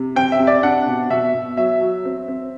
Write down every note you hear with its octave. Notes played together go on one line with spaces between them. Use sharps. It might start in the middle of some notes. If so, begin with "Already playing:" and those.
Already playing: C3
C4 G5
E5
C3
D5
D4 F#5
B2
B2 E5
B2
F#3 E5
F#3
C4
C4